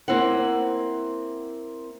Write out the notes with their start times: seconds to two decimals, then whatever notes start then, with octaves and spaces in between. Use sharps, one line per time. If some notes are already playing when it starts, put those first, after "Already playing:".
0.08 A#3 C4 E4 C5 F#5